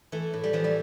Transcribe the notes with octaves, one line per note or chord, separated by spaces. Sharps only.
E3 A3
A2
G3
E3 F3
G3